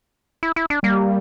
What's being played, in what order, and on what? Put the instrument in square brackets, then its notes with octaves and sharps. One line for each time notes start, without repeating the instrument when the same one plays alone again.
[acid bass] E4
E4
D4
[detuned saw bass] G3 [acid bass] A#3